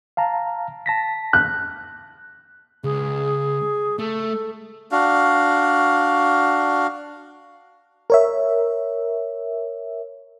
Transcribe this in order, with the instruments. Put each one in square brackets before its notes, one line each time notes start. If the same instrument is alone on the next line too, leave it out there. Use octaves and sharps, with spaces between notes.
[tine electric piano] F5 A5 A#5
A5 A#6 B6
[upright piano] F#6
[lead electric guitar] C#2 [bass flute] G#4
[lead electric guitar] A3 [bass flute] A4
[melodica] D4 F#4 F5
[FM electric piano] A#4 C#5 E5